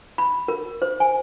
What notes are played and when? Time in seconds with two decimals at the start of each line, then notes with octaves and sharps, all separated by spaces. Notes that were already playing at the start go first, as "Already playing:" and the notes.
0.18 B5
0.48 A#4
0.82 C5
1.00 G#5